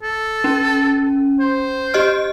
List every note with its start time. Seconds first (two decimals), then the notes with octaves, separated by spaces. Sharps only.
0.03 A4
0.44 C#4
1.40 C5
1.94 G4 D#5 F6